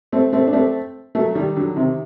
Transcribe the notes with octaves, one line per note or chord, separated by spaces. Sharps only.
A3 C4
A3 C4
D4
A3 C4
F#3 A3
D#3 G3
D3 F#3
C3 D#3